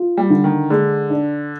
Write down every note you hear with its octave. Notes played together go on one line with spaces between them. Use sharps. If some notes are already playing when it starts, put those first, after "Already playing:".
Already playing: F4
G3
D3
D#3
D3 G#3
D4